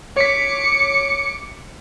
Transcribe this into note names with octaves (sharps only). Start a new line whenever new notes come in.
C#5 D6 B6 C#7